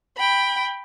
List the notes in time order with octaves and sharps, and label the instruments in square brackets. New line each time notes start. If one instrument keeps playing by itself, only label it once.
[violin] G5 B5